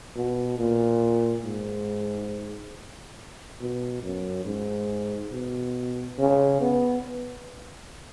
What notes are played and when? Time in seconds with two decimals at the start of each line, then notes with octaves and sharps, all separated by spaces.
0.16 B2
0.58 A#2
1.44 G#2
3.60 B2
4.03 F#2
4.45 G#2
5.32 B2
6.19 C#3
6.61 B3